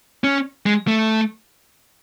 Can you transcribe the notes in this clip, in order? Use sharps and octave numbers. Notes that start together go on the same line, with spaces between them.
C#4
G#3
A3